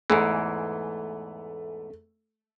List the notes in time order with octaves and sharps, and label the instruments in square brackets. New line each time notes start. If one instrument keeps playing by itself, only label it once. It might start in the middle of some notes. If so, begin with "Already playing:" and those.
[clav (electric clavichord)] E2 G#2 E3 [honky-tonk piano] A3